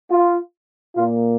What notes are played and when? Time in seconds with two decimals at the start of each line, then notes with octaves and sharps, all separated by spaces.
0.10 F4
0.95 A#2 A#3 F4